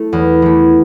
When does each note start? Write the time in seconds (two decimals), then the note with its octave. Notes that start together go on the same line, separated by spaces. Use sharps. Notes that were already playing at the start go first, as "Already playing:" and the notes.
Already playing: A3 E4 A4
0.13 E2
0.42 E3 A3